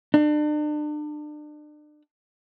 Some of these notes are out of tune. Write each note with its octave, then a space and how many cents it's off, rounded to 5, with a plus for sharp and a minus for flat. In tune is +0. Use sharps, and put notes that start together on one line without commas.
D4 +35